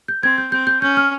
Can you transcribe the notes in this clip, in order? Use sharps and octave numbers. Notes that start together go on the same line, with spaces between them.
G6
C4 G#6
G6
C4 G6
G6
C#4 G6
F6